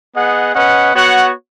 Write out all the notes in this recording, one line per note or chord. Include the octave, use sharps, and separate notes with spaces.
B3 G#4 D#5 F#5
C#4 B4 D#5 F#5
B3 F#4 C#5 F#5